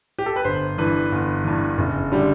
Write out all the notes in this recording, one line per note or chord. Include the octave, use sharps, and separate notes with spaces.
G4
A4
B4
G1 C5
G2 E3 B4
G1
G2 E3
F#1
D3 G3